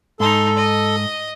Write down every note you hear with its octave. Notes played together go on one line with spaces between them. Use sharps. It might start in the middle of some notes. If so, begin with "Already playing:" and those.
G#2 D#4 A4 C6
D#5